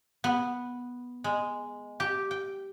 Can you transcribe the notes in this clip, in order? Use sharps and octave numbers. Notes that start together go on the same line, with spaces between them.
B3
G#3
G4
G5